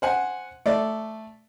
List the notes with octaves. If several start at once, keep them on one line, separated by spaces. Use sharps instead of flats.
C5 F#5 G#5
A3 D5